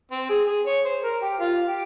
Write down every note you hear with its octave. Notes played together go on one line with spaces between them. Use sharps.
C4
G#4
G#4
C#5
C5
A#4
G4
F4
G4